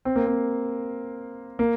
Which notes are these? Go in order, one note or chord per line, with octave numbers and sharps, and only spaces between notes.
C4
A#3
C4
A#3